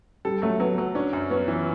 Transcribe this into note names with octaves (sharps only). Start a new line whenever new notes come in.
G3 A4
F#3 A3
F#3 B3
F#3
C#4 D4
F#2
B3 C#4
E3